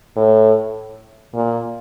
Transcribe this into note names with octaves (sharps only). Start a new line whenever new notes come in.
A2
A#2